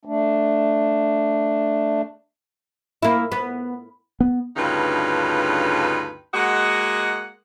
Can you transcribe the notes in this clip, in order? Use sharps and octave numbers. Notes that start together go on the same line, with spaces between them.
A3 D4
A#3 E4
B3
B3
D2 G2 C#3 D#4 F4 B4
G#3 A#3 F#4 D#5 F#5